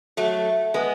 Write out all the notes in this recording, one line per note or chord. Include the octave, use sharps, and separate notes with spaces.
F#3 A3
G#3 B3